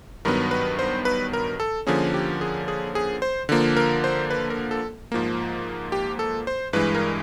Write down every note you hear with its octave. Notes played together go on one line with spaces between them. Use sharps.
G2 D#3 F#3 B3 A#4
B4
C5
B4
A#4
A4
D3 F3 A#3 C#4 G#4
G4
G#4
G#4
G#4
C5
D3 F3 A#3
A#4
C5
B4
A#4
A4
G#2 F3 A#3
G4
A4
C5
G2 E3 G#3 B4
A#4